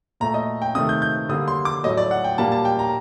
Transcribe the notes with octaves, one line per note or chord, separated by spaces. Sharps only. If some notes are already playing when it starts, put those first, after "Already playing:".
A#2 A3 A#5
D#5
G5
C3 D#3 A3 D#6
G6
G6
D3 G3 A#3 D#6
C6
D6
A2 F#3 A3 D#5
D5
F#5
G5
A#2 G3 A#3 A5
A5
G5
A#5